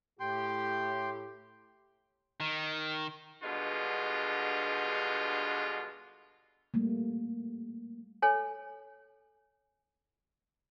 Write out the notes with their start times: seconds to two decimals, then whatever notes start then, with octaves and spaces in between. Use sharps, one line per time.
0.20 A2 G4 G5 C6
2.40 D#3
3.43 G2 B2 D3 G#3 F4
6.74 G3 A3 A#3
8.22 A4 C#5 G#5